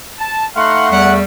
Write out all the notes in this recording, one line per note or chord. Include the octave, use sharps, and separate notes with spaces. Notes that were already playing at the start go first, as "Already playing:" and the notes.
A5
A3 D#4 F5 F#5 C6
E2 G3 F#5